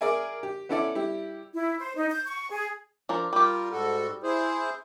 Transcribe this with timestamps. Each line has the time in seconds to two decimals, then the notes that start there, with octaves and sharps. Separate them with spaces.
0.01 G#4 A#4 D5 E5 G#5
0.43 G4
0.69 B3 C#4 E4 A4 D5 E5
0.95 G3 E4 G4
1.54 E4
1.79 C5
1.96 D#4
2.10 G6
2.26 C#6
2.51 G#4
3.09 F3 D4 A#4
3.33 G3 F4 G4 A#4
3.72 G#2 F#4 A4
4.23 E4 G#4 C5